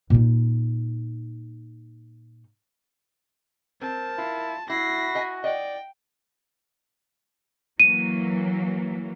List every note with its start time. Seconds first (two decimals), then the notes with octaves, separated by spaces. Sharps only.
0.10 A#2 D#4
3.81 C4 A#4 A5
4.18 E4 F4
4.70 E4 F#4 B5 A#6 C7
5.15 D#5 G#5
5.44 D5 D#5 F#5 G5
7.80 E3 F#3 A#3 D#7